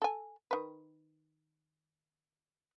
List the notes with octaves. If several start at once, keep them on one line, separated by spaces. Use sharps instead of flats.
A4 G#5
D#3 B4